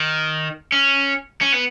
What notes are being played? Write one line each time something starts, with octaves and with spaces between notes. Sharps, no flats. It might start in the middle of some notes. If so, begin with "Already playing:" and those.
Already playing: D#3
C#4
C#4
B3